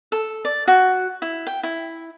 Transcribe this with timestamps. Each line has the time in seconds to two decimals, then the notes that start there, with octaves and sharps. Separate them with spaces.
0.12 A4
0.45 D5
0.68 F#4
1.22 E4
1.47 G5
1.63 E4